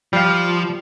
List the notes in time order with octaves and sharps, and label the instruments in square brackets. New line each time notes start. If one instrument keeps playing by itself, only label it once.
[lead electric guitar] F3 [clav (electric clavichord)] G3 F5